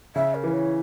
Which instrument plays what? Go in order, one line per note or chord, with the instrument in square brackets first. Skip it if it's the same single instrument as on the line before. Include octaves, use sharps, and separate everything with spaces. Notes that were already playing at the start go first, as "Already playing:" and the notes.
[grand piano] C#3 [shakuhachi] E5
[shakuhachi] A#4
[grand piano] E3
[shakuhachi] C#5